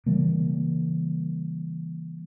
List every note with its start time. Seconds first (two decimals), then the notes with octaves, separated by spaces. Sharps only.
0.06 C#3 E3 G3 A#3